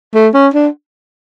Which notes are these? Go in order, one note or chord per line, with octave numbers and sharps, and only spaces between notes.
A3
C#4
D4